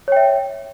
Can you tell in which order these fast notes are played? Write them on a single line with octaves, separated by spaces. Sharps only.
C#5 G5 E5